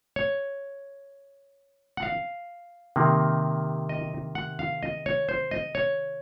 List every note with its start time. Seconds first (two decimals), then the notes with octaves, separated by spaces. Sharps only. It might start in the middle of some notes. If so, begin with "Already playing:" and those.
0.16 C#5
1.97 F#5
2.03 F5
2.96 C3 D#3 A#3
3.89 D#5
4.35 F#5
4.59 F5
4.83 D#5
5.06 C#5
5.29 C5
5.51 D#5
5.75 C#5